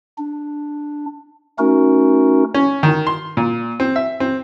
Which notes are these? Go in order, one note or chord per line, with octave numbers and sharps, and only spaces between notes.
D4
A3 C#4 D#4 F#4 A#4
C#4
D#3
C6
A#2
C4
E5
C4